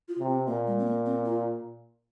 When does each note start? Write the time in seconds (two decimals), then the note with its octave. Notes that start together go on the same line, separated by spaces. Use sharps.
0.08 F4
0.19 C3
0.28 C4
0.47 A#2 A#3
0.67 G#3
0.79 C4
0.86 A#3
1.06 C4
1.25 F4